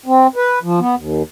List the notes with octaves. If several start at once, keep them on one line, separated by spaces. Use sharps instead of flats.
C4
B4
F3
B3
D#2